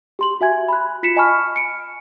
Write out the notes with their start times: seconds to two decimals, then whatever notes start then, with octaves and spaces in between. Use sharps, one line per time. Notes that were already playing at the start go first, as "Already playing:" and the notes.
0.19 G4 C6 F#7
0.41 F#4 E5 G#5 G#6
0.69 B5 F#6
1.03 F4 B6 C#7 E7
1.16 D#5 G#5 A5 B5 C#6 F6
1.56 C#7 D7